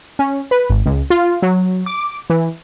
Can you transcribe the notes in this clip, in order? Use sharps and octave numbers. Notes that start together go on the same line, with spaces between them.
C#4
B4
G#1
C#2
F4
F#3
D6
E3